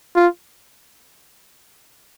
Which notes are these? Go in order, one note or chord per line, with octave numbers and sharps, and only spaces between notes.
F4